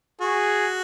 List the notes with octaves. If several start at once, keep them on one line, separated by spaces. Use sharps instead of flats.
F#4 G#4